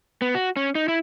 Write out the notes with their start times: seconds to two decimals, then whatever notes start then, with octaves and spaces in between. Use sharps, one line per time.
0.22 B3
0.35 F#4
0.56 C#4
0.75 D#4
0.88 E4